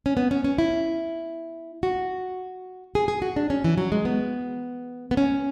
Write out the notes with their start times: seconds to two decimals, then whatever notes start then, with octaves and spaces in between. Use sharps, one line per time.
0.06 C#4
0.17 B3
0.31 C#4
0.44 C#4
0.58 E4
1.83 F#4
2.95 G#4
3.08 G#4
3.22 F#4
3.36 D4
3.50 C#4
3.64 E3
3.78 F#3
3.92 G#3
4.05 B3
5.11 B3
5.17 C#4